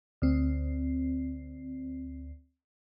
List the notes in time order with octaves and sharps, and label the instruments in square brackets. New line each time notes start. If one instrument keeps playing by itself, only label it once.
[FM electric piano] D2 C4